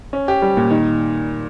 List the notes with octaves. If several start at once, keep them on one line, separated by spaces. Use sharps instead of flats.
C#4
G4
G3
A#2
D#3